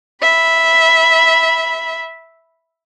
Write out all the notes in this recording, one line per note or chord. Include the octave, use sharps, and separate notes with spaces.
E5 B5